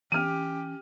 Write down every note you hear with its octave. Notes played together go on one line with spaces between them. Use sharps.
E3 C#4 G4 F6 D#7